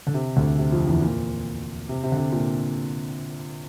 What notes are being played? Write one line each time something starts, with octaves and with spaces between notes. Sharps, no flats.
D3
C3
D2 D3
C3
F2 F3
E2 E3
A#2
C3
C3
D3
C3
A#2